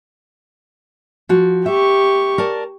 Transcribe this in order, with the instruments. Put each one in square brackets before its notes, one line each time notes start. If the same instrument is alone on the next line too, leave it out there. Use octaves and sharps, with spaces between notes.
[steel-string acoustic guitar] F3 F#4
[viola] G4 C#6 [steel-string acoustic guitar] E5
[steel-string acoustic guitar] A#4 D5 A5